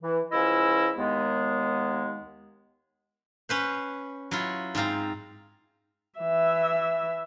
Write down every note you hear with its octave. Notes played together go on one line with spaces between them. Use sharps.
E3
C#2 F3 C#4 E4 D#5 E6
D#2 G#3 B3
C#4 B4 C5
F#3 E4 F4
G#2 C4 F5 A#5
E3 E5